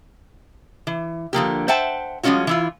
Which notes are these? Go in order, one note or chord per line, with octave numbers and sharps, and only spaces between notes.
E3
D3 F3 A#3 G4
C5 E5 F#5 G5 A5
F3 G3 G#3 C#4 F4 F#4
E3 E4 F4